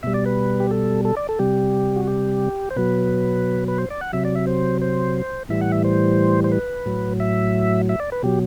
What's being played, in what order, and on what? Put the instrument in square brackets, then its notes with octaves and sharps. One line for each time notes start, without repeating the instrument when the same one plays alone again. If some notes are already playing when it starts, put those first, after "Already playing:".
[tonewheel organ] B2 G3 E5
D5
B4
G4
A4
A4
D5
A4
C3 G3 G4
F#4
G4
C5
B2 F#3 B4
B4
C5
D5
F#5
C3 F#3 E5
D5
E5
C5
C5
A2 E3 G3 E5
F#5
E5
C5
C5
B4
A2 F#3
E5
E5
D5
B4
B2 F#3 G4